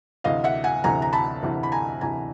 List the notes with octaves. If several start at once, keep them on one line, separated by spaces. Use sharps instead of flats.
D2 C3 E3 D#5 F5
E5 F#5
F#5 G#5
D2 C3 E3 G#5 A#5
A#5
A5 B5
D2 C3 E3
B5
G#5 A#5
D2 C3 E3 G#5 A#5